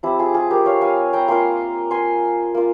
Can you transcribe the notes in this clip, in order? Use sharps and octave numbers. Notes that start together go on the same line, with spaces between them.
F3 C4 E4 G4
F4 G#4
F4 G#4
G4 A#4
C#5 F5
F5 G#5
G5 A#5
A#3 F4 G#5 C6
G#5 C6
A#3 F4